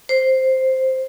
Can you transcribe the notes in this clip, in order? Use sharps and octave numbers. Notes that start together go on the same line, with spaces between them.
C5